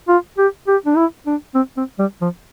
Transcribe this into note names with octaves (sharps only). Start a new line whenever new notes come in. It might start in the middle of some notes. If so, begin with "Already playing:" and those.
F4
G4
G4
D4
E4
D4
C4
C4
G3
F3